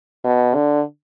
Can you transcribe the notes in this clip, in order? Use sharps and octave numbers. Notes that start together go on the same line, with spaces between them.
B2
D3